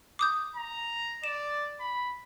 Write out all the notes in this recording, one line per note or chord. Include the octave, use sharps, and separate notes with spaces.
D6 D#6 G6
A#5
D5 E7
B5